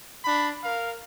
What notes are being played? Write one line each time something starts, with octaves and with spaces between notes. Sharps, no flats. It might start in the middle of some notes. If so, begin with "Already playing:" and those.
D4 B5
A#4 F5